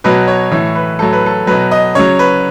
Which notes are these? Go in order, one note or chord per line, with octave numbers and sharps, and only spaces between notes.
B2 F#3 B4
C#5
A2 E3 C#5
B4
A2 F#3 A4
B4
A4
B2 F#3 B4
D#5
C#3 F#3 C#5
B4